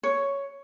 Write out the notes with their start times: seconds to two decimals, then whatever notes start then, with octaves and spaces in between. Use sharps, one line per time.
0.03 C#5